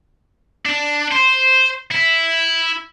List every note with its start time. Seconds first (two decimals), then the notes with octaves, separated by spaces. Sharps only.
0.66 D4
1.12 C5
1.92 E4